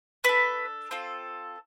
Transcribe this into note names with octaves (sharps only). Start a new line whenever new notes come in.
D4 A4 B4
C4 F4 A4